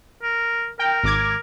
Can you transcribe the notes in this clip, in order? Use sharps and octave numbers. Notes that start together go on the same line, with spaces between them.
A#4
A#4 G5
G#1 D6 G#6